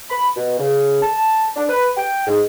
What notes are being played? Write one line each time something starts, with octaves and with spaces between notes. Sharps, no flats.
B5
B2
C#3
A5
D4
B4
G5
G#2